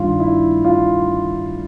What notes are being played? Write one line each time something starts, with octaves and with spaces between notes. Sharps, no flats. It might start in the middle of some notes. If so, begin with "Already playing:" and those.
Already playing: G2 D#3 G3 F4
E4
F4